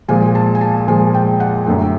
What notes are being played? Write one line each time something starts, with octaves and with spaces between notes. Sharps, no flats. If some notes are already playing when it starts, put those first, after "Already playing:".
A#2 F3 G#3 G#5
A5
G#5
A5
A#2 F3 G#3 G#5
G5
F#5
F#2 D3 F#3 A3 G5